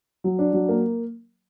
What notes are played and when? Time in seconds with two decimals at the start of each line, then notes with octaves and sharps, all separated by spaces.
0.24 F#3
0.39 D4
0.53 F#3
0.69 A#3